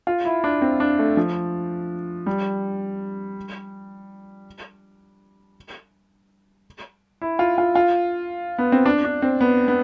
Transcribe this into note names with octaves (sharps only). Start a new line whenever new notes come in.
F4
E4
D4
C4
D4
A3
F3
G3
E4
F4
F4
F4
B3
C4
D4
D4
C4
B3
B3